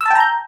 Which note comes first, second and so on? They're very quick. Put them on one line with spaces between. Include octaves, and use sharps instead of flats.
E6 A5 G5 A#5 G6